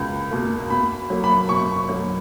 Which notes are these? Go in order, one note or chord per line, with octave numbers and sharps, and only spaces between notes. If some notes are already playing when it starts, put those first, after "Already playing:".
Already playing: C#2 B2 A#3
B2 A#3
B2 B5
F#3 A#3
B5
B2 C#6
F#3 A#3